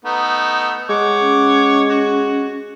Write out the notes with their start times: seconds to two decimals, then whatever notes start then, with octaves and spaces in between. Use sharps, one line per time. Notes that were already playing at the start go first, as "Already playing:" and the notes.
0.05 A3 B3 D#4
0.90 G#3 C#5 F#5 D6
1.20 C#4
1.89 F#4